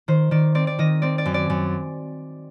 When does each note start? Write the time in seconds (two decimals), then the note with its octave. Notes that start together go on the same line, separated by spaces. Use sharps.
0.08 D#3 C5
0.31 D#3 D5
0.55 C4 D5
0.67 D5
0.79 D#3 D#5
1.02 C4 D5
1.18 D5
1.26 F#2
1.34 D5
1.50 F#2